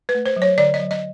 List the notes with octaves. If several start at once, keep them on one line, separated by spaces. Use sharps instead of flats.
B4
A3
C5
F#3
C#5
D3 D5
D#5
F#3
D#5